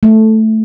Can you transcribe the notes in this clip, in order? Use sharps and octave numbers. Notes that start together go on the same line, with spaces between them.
A3